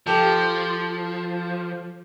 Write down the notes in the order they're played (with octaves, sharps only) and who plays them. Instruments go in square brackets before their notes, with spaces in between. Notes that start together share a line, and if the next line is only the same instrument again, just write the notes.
[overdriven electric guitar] F3 [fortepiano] G4 A4